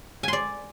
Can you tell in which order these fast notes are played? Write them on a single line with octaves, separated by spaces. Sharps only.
G#5 C6 D5